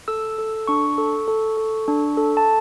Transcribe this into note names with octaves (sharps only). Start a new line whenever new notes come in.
A4 E6
A4
D4 C#6
A4
A4
A4
D4
A4
A5